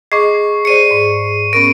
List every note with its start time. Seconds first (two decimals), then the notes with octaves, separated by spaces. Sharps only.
0.12 G#4 D#5 C#6 D6 C7
0.65 G#4 C5 D5 C#7 D#7
0.91 G#2
1.53 B3 C#4 A#4 D7